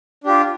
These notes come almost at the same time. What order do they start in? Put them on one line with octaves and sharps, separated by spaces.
D4 G4 F4